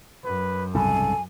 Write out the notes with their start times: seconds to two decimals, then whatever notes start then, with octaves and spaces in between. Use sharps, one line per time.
0.25 F#2 B4
0.75 C2 G#2 C#3 A4 G#5